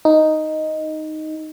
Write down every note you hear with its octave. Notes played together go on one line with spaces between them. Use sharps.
D#4